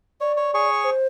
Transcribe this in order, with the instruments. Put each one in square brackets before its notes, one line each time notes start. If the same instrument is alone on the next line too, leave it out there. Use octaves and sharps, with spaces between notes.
[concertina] C#5 [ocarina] D5
[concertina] C#5
G#4 C#5 C#6
[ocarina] C5